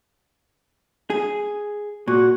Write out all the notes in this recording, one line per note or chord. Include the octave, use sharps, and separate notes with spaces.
G#4
A#2 F#4